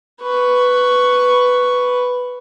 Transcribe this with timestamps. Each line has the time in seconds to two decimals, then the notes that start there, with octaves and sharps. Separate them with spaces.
0.21 B4 C#6